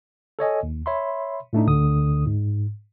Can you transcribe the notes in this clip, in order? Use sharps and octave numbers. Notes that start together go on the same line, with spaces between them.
A4 C#5 D#5 G#5
D#2
C#5 E5 B5 C6
A2 A3 D4 D#4
D2 D3 D#6
G#2